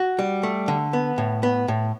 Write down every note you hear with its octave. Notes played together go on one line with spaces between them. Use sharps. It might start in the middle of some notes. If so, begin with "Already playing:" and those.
Already playing: F#4
G3
A3
D3
B3
A2
B3
A2